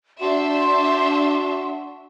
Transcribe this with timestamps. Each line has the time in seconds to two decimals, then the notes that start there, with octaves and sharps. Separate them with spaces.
0.21 D4 F#4 E5 C6